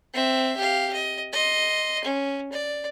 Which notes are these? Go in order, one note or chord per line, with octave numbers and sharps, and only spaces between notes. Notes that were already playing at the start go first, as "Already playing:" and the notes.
C4 E5
G4 F5
D#5
D#5 C6
C#4
D5